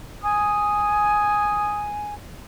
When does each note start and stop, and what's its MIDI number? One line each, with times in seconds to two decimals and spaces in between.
0.23 2.13 80
0.23 1.83 87